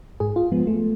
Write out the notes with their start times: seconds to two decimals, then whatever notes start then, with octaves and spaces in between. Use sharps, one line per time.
0.20 G#2 G#4
0.36 F4
0.52 F3 G#3 B3
0.67 A3